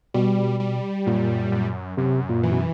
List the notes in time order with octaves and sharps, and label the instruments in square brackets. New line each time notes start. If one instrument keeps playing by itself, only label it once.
[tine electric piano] B2 [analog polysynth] G3
[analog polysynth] G3
[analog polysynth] F#2 [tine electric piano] A#2
[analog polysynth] F#2
[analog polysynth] F#2 [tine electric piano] C3
[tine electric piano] A#2
[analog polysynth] E3
[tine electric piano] B2